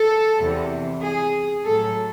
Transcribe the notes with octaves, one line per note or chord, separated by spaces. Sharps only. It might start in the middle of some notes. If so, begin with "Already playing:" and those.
Already playing: A4
E2 C3 E3
G#4
A2 F#3 A4